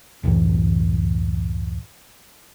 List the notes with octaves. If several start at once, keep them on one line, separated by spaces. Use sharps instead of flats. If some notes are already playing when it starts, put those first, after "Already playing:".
C#2 F#2 A2 E3